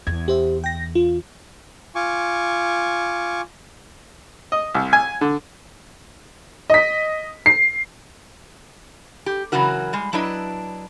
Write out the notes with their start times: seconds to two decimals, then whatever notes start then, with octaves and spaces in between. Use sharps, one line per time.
0.07 E2 G#6
0.28 G4 C5 E5
0.64 G5 A#6
0.95 F4
1.95 F4 G#5 C#6 D6
4.52 D#5
4.75 C2
4.93 G#5
5.21 D3
6.70 D#5 B6
7.46 C7
9.26 G4
9.52 C#3 E3 F#3 F#4 A#4
9.93 G3 G#3
10.13 F#3 D4 E4 B4 D#5